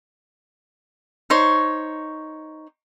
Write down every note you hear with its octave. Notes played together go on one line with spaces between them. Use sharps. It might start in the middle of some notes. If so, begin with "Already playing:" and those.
D#4 C5 C#5